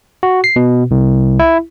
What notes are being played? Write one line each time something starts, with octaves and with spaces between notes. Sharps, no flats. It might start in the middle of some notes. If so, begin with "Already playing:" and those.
F#4
C7
B2
C2
E4